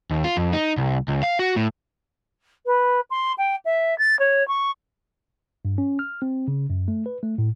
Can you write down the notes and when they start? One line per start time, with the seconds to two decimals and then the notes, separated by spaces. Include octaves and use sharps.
0.11 D#2
0.24 F4
0.37 F2
0.53 D#4
0.77 C2
1.08 C#2
1.23 F5
1.39 F#4
1.56 A2
2.66 B4
3.10 C6
3.38 G5
3.65 E5
3.98 A6
4.19 C#5
4.48 C#6
5.65 G2
5.78 C#4
5.99 F6
6.22 C4
6.48 C#3
6.70 F#2
6.88 A3
7.06 B4
7.23 A3
7.38 A2